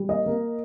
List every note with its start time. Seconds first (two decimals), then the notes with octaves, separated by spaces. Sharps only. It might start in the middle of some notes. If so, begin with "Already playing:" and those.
Already playing: G3
0.09 A#3 D#5
0.26 A#3